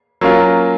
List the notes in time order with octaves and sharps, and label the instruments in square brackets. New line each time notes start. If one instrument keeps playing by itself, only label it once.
[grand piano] F#3 A#3 C#4 F4 A#4